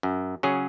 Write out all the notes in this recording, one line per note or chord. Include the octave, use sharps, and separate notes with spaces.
F#2
C#3 F#3 C#4 G#4